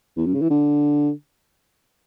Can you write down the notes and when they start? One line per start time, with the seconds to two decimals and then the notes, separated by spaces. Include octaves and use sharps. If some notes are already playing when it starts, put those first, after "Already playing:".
0.17 E2
0.26 F#2
0.34 C#3
0.42 E3
0.50 D3